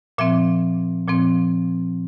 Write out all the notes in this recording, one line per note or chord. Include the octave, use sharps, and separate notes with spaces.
A#2 F3 C4 E5
A#2 F3 C4